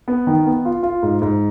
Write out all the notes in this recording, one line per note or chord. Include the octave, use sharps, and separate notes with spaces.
B3
D#3
B3
F4
F4
G#2
G#2